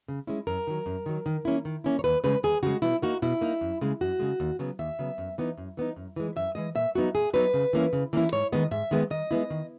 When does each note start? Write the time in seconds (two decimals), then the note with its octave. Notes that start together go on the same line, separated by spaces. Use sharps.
0.08 C#3
0.27 G#3 C#4 E4
0.47 F#2 A#4
0.67 D#3 F#3
0.86 F#2
1.06 D#3 F#3
1.26 D#3
1.45 A#3 C#4 E4
1.65 D#3
1.84 A#3 C#4 E4
1.99 C#5
2.04 D#2 B4
2.24 C#3 G#3 B4
2.43 D#2 G#4
2.63 C#3 G#3 F#4
2.82 B2 E4
3.02 A#3 D#4 F#4
3.22 B2 E4
3.41 A#3 D#4
3.61 F#2
3.81 C#3 G#3
4.01 F#2 F#4
4.19 C#3 G#3
4.40 D#2
4.59 C#3 F#3 B3
4.79 D#2 E5
4.99 C#3 F#3 B3
5.18 F#2
5.38 E3 B3 D#4
5.58 F#2
5.77 E3 B3 D#4
5.96 F#2
6.16 E3 G#3
6.36 F#2 E5
6.55 E3 G#3 D#5
6.75 A#2 E5
6.95 F#3 B3 D#4 F#4
7.15 A#2 G#4
7.34 F#3 B3 D#4 B4
7.54 C#3
7.73 E3 A#3 C#4 E4
7.93 C#3
8.13 E3 A#3 C#4 E4
8.32 G#2 C#5
8.52 D#3 G#3 B3 D#5
8.71 G#2 E5
8.91 D#3 G#3 B3
9.10 D#3 D#5
9.31 G#3 B3 E4
9.50 D#3